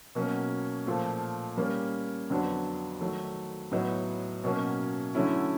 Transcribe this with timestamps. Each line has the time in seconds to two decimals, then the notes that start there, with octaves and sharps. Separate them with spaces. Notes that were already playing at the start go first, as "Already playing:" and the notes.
0.15 B2 F#3 A#3 C#4
0.86 A#2 F3 A3
1.57 G3 A#3 C#4
2.30 F2 D3 F#3 B3 D4
3.01 D#3 F#3 A3
3.71 A2 F#3 B3 D#4
4.44 B2 F#3 A#3 C#4
5.15 D3 F#3 A3 C#4 E4